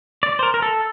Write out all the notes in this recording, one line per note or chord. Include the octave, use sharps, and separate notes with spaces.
D5
C5
A#4
A#4
A4